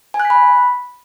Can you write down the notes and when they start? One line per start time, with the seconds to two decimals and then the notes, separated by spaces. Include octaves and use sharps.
0.14 G#5
0.20 F#6
0.25 B6
0.30 B5